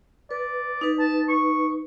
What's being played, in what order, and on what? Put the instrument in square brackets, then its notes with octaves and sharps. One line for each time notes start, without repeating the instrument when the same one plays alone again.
[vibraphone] B4 [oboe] D5
[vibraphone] D#4 B4
[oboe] A5
C#6